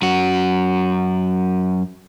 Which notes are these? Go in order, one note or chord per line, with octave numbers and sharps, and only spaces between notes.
F#2 F#4